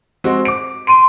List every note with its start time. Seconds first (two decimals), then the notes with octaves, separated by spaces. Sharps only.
0.24 G#3 C4 F#4
0.45 D6 D7
0.87 C6 D7 D#7